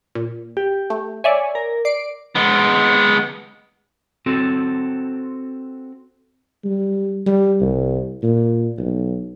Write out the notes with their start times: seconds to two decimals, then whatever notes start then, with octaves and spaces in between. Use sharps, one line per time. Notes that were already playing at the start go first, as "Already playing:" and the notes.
0.15 A#2
0.57 G4
0.90 A3
1.24 C#5 D5 E5 G#5
1.55 A#4
1.85 D5 C7 D7
2.35 G#3 B3
4.26 C4 F#4 A4
6.65 G3
7.26 G3
7.61 C2
8.23 A#2
8.78 B1